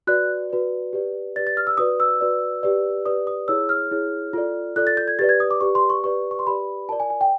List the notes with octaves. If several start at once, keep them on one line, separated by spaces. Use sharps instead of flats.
F#4 B4 D5 F#6
F#4 B4 D5
G4 B4 D5
G4 B4 D5 A6
A6
F6
E6
F#4 B4 D5 D#6
E6
F#4 B4 D5
G4 B4 D5
G4 B4 D5 D#6
D#6
E4 G#4 C#5 E6
F6
E4 G#4 C#5
F4 A4 D5
F4 A4 D5 F#6
A6
G6
G#6
G4 B4 D5 A6
G#6
D#6
D6
G4 B4 D5 C#6
C6
C#6
G4 B4 D5 C#6
C#6
C6
G4 B4 D5 B5
F4 A#4 D5 A5
G#5
G#5
G5